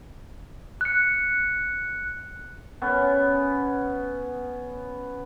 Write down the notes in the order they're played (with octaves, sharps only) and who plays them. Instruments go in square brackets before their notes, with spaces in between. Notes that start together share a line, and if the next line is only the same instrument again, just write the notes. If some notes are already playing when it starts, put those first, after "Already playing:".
[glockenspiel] F#6 C#7
[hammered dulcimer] B3 C#4